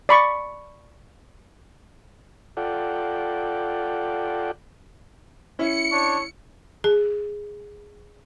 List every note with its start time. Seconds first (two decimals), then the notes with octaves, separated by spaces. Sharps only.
0.09 D5 B5 C#6
2.57 F4 A4 D5 F#5 G5
5.59 C#4 E4 C#7
5.92 D4 C#5
6.84 G#4